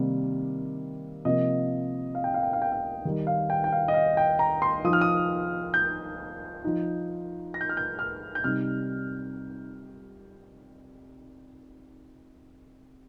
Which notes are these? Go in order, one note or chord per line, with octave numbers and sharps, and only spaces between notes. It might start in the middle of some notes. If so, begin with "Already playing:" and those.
Already playing: C3 D#3 G3 A#3
C3 F3 A#3 D#5
F5
G5
F5
G5
F5
G5
F5
D#3 G3 D#4
F5
G5
G5
F5
D#5
F5
G5
A#5
C6
F3 D#4 D#6
F6
D#6
G6
F3 D#4
A#6
G6
F6
G6
F6
G6
C3 G3 D#4 F6